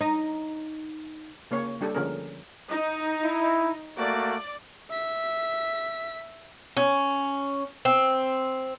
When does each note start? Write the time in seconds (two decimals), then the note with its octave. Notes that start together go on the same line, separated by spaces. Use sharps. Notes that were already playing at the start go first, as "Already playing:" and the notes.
0.01 D#4
1.51 C#3 A#3 C#4 C#5
1.81 G3 D4 G4 A4
1.95 D3 F3 C#4 G#4 A#4
2.70 D#4
3.24 E4
3.98 A3 A#3 F#4 D5
4.90 E5 B6
6.77 C#4
7.85 C4